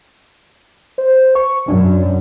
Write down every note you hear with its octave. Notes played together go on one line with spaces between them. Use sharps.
C5
C#6
F#2 D4